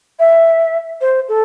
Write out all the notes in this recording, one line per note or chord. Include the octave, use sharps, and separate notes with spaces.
E5
C5
A4